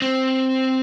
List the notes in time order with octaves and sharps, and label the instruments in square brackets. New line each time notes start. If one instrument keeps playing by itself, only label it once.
[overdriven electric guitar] C4